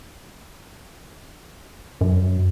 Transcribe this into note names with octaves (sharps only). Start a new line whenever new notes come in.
F#2